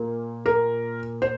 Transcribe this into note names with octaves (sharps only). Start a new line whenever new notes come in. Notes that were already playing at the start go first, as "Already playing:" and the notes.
Already playing: A#2 A#3
A#4
C5